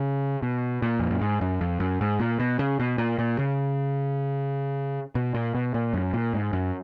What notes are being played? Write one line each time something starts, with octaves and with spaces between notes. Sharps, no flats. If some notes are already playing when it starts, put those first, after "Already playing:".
Already playing: C#3
B2
A#2
F2
F#2
G#2
F#2
F2
F#2
G#2
A#2
B2
C#3
B2
A#2
A#2
C#3
B2
A#2
B2
A#2
F#2
A#2
G#2
F#2